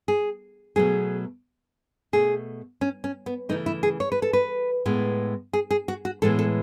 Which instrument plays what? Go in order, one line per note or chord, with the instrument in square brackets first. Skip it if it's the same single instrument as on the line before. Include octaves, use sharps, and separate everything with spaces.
[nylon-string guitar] G#4
B2 F#3 A3 G#4
B2 A3 G#4
C#4
C#4
B3
C#3 E3 A3 D#4
E4
G#4
C#5
B4
A4
B4
A2 G#3 B3
G#4
G#4
F#4
F#4
A2 E3 G#3 B3 A4
A4